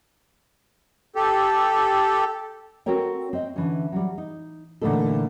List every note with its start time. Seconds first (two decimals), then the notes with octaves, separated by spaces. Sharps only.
1.15 G4 A4
2.86 C4 F#4 A4 A#4 C#5 G5
3.33 C4 D#5
3.56 D3 E3 C#4
3.92 F#3 G3
4.18 D#4
4.81 A#2 D3 E3 A3 D#4 A4